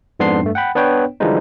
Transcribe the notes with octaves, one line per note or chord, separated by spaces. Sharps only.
F2 G#2 B3 D4 C6 C7
G2 A3
F#5 G5 B5
B3 D4 B4 C#5 G5
D3 E3 F3 G3 G#3 D#4